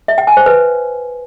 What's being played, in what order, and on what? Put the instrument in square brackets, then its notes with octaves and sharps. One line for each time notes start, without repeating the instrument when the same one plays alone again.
[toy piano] E5
G5
G#5
C5
B4